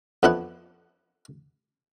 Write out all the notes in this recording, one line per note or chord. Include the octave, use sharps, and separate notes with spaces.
F2 B3 D4 E4 F#5